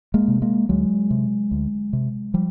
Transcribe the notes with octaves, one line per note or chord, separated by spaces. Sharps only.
G#3 A#3
C3
G#3 A#3
D2 F#3 G#3
C3
D2
C3
F3 G3